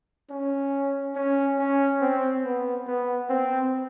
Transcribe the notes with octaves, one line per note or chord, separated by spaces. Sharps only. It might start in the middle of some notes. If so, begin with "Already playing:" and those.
C#4
C#4
C#4
C4
B3
B3
C4